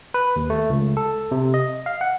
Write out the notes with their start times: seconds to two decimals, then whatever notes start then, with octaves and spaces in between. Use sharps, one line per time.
0.14 B4
0.36 D#2
0.50 A3
0.70 C#2
0.97 A4
1.31 C3
1.54 D#5
1.86 F5
2.01 F#5